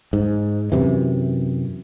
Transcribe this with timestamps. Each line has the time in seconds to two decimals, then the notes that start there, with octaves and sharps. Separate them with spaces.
0.13 G#2
0.72 F#2 C3 E3